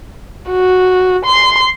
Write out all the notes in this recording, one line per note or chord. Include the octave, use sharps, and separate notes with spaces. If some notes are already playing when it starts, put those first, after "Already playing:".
F#4
C6